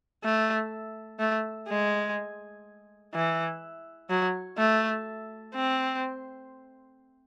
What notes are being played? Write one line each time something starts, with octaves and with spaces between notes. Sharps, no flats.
A3
A3
G#3
E3
F#3
A3
C4